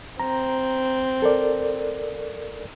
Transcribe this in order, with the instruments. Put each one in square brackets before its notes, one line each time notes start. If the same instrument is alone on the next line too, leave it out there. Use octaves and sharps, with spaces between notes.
[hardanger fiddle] C4 [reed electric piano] A#5
[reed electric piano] A4 A#4 D5